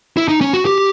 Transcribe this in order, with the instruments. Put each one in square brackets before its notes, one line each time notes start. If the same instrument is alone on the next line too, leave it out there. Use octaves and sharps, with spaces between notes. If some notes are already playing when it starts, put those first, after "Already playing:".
[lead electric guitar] E4
D#4
C#4
F#4
G4